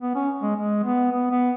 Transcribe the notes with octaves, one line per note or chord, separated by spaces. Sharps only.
B3
C#4
G#3
G#3
B3
B3
B3